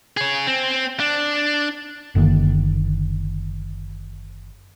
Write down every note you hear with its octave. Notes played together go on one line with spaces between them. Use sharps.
G#4 C#5
C4
D4
F#1 D3 D#3 A#3